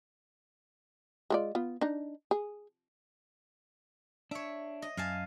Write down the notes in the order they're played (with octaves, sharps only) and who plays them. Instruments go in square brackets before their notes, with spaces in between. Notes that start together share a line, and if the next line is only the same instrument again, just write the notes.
[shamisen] G#3 F4 D5
B3 F4
D4 D#4
G#4
[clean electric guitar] D4 [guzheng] C#5 E5
[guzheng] D#5
[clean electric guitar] F#2 [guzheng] F5 G#5 A5